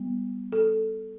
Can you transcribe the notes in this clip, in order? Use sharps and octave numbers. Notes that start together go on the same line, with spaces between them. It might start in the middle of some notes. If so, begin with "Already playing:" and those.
Already playing: G3 B3
A4